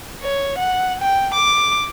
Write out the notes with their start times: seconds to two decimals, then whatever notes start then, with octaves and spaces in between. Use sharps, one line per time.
0.22 C#5
0.59 F#5
1.01 G5
1.34 D6